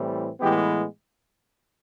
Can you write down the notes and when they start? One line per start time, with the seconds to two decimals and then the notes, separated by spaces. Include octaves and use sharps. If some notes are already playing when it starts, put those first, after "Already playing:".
Already playing: A2 E3 G3 C4
0.40 A2 E3 G#3 B3 G4